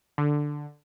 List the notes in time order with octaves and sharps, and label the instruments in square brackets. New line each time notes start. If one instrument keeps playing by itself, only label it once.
[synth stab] D3